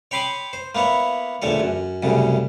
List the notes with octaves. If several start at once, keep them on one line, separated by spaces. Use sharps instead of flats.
C#5 G5 B5 C6 D6 D#6
C5
A#3 B3 E4 C#5
A#1 E2 D3 A3 C#5
F#2
C2 F#2 A2 C#3